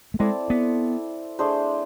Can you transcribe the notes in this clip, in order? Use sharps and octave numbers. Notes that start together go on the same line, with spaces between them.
A3
G#3 C4 E4 A4 D5
B3
A3 D4 G#4 C5